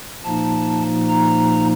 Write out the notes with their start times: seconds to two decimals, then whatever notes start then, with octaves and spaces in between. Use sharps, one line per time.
0.23 A#2 F3 A#3 D#4 A5
1.08 A#5